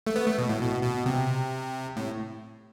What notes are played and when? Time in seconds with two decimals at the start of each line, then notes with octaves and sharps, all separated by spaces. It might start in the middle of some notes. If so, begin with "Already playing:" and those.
0.07 A3
0.16 B3
0.27 A3
0.38 B2
0.49 A2
0.61 B2
0.83 B2
1.06 C3
1.97 A2